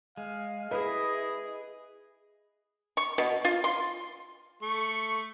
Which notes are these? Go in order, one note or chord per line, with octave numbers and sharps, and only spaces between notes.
G#3 F5
E4 G#4 B4 D#5
C#6
B2
F4
C6
A3 C#6